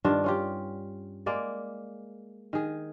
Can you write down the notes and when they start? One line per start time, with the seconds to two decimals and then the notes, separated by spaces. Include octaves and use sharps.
0.04 G2 D#3 D4 F4
0.24 C#4 F4 G4
1.26 G#3 A#3 D5
2.53 D#3 G#4